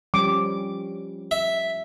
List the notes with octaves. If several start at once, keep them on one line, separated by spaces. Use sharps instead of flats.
F3 G3 C#4 D6
E5